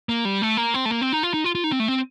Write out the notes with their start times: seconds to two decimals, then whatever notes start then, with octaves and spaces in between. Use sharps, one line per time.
0.09 A#3
0.25 G3
0.42 A3
0.57 A#3
0.74 C4
0.85 A3
0.91 A#3
1.01 C4
1.13 D#4
1.23 F4
1.34 D#4
1.44 F4
1.55 F4
1.64 D#4
1.72 C4
1.80 A3
1.88 C4